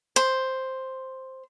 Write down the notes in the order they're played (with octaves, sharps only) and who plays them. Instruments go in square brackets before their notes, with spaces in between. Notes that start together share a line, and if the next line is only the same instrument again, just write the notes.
[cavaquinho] C5